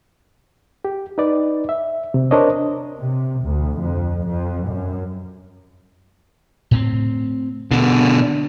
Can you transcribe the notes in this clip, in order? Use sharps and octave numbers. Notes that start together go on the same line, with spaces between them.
G4
D#4 B4 D5
E5
C3
D4 A#4 C5 C#5 D#5
C3
D2
F2
F2
F#2
A2 C4
B2 D3 D4